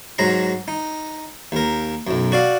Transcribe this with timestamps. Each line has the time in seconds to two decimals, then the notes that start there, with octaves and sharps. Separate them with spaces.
0.18 G#2 F#3 A#5 C6
0.68 D#4
1.52 D#2 A#4
2.07 B1 F#2
2.32 F#4 D5 F5